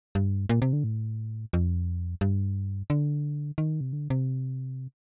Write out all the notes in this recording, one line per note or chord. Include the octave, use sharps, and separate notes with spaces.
G2
A#2
C3
D3
A2
F2
G2
D3
D#3
C3
D3
C3